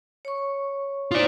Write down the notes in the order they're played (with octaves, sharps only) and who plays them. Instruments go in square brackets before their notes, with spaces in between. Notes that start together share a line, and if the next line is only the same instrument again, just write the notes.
[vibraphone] C#5 C#6
[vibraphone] D#4 C5 [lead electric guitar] F4 D5